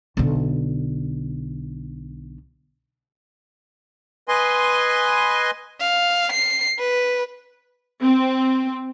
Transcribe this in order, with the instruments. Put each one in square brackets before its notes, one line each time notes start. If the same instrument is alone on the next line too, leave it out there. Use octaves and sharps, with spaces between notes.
[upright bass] B1 D3
[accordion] B4 D#5 G#5 C6
[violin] F5
C7
B4
[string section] C4